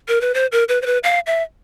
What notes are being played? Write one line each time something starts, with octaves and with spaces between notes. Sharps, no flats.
A#4
B4
C5
A#4
B4
C5
B4
F5
E5